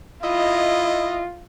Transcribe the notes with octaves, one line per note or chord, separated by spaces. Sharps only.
E4 F4 D#5